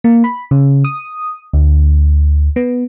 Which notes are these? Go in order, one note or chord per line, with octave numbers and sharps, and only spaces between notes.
A#3
B5
C#3
D#6
D2
B3